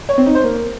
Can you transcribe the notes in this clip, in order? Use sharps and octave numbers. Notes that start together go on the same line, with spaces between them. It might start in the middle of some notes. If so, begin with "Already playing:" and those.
C#5
C4
D#4
C5
A#3